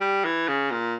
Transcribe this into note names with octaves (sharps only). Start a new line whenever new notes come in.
G3
E3
C#3
A#2